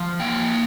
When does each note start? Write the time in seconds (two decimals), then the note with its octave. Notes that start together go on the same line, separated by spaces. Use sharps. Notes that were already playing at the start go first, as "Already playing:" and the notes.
Already playing: F3
0.19 A#3 G5